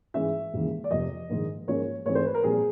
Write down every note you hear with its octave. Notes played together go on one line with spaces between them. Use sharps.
G#2 E3 G#3 C#4 E5
E1 D#2 C#3 E3
D5
F1 F2 C3 D#5
A#1 G#2 D#3
G#2 F3 A#3 C#4 C#5
G#2 E3 A3 C4 C#5
C5
B4
A#4
A#1 A#2 G3 C4 G#4